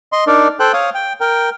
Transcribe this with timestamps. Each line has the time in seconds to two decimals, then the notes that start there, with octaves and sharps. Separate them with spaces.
0.13 D#5 C6
0.27 D4 D#4 A#4 D5
0.60 A4 C5 G5 F#6
0.73 C#5 F5 D#6
0.95 G5
1.21 A#4 G5